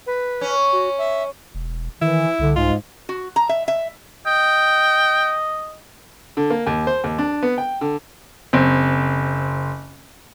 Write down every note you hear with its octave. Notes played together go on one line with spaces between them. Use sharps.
B4
C#4
F#4
E5
E1
D#3 E3 E4
C2 D3
G#2 G#3 F4
F#4
A#5
E5
E5
D#5 G5
D3
A#3
D#2
C5
D#2
D4
B3
G5
D3
F#1 C4